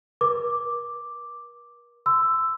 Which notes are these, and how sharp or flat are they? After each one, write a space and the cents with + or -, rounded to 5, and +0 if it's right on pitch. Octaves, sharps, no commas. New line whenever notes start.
A#4 +45 D6 +0
C6 -25 E6 +5